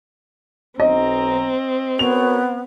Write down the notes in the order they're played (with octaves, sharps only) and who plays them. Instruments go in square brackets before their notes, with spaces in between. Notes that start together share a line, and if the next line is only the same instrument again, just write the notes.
[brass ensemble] B1 A#5 [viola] C4 [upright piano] D#5
[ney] B3 [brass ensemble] F#4 A#4 C#5 [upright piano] F7